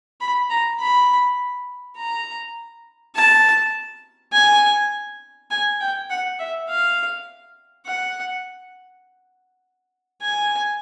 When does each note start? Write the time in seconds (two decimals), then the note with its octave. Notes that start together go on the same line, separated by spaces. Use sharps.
0.21 B5
0.50 A#5
0.80 B5
1.97 A#5
3.15 A5
4.33 G#5
5.51 G#5
5.80 G5
6.10 F#5
6.39 E5
6.69 F5
7.86 F#5
10.22 G#5